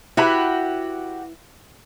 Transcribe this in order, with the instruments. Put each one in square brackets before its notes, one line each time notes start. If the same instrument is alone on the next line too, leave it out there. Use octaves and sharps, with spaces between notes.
[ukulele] E4 B4 B5 [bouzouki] F#4 G4